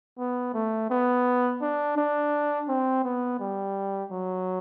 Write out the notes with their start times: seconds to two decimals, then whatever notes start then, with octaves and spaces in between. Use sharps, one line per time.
0.18 B3
0.54 A3
0.90 B3
1.61 D4
1.97 D4
2.68 C4
3.04 B3
3.40 G3
4.11 F#3